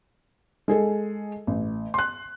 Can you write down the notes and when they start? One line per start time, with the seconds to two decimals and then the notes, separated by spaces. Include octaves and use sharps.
0.68 G#3 G#4 A4
1.47 A1
1.94 C6 F#6